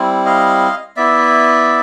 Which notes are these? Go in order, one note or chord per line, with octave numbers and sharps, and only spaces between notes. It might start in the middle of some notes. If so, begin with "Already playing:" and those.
Already playing: G3 C4 E4
D#5 F5
B3 E4 D5 E5